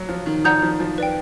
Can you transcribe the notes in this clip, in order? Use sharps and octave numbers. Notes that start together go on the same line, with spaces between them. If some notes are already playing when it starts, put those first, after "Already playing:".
Already playing: F#3
F3
D#3
F3 D5 F#5 A#5 D#6 G6
F3
F3
B4 D5 G5